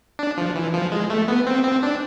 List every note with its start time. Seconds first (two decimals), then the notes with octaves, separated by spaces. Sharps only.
0.19 D4
0.38 F3
0.55 E3
0.74 F3
0.92 G#3
1.10 A3
1.28 B3
1.46 C4
1.64 C4
1.83 D4